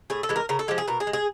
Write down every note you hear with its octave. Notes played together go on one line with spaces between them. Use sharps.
A2 G#4
A4
E3 G#3
A#4
C#3 A#4
A4
F3 G#3 G4
G#4
B2 A#4
G#4
G#3
G#4